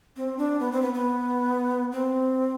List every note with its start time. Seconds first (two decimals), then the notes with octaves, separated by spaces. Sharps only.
0.17 C4
0.38 D4
0.60 B3
0.72 C4
0.82 B3
0.94 B3
1.92 C4